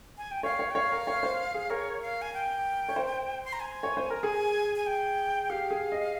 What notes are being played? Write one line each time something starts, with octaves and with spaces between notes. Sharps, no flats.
G#5
G5
C#5 F5
C#5
G5
C#5 F5
A#4
C#5
C5
G#4
A#4 C#5
F5
G#5
G5
C#5
C5
C6
A#5
G#5
C#5
C5
A#4 A#5
G#4 G#5
G#5
G5
G4 F5
G#4
D#5